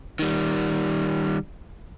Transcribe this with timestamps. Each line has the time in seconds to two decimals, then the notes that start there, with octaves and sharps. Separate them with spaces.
0.19 D#3 G3